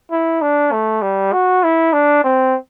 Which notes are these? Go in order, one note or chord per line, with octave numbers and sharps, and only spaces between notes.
E4
D4
A3
G3
F#4
E4
D4
C4